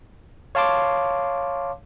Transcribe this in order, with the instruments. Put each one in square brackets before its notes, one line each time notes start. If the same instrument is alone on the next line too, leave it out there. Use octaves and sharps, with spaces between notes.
[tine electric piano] C#5 F5 A5 C6 D6